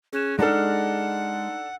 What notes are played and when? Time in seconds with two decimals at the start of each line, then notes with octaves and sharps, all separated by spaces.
0.13 C#4 G#4 F#6 E7
0.39 G#3 D4 D#4 A4 F#5 A5 A#5 F6